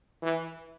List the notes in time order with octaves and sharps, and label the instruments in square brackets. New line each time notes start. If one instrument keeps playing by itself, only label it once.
[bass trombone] E3